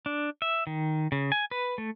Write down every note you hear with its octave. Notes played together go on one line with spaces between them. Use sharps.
D4
E5
D#3
C#3
G#5
B4
A3